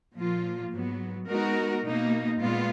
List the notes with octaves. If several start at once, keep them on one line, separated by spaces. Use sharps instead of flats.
A#2 F3 A#3 F4
G#2 F#3 B3
G#3 B3 D#4 F#4 A#4
B2 A#3 D#4
A#2 G#3 B3 F4